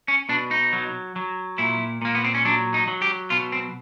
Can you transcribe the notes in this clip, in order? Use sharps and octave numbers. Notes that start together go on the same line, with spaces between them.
C#4
B2 D4
D#4
F#3
F#3
A#2 E4
A#2 A#3
B3
C4
C#4
F#3 D4
D#4
F#3
G4
B2 F4
C4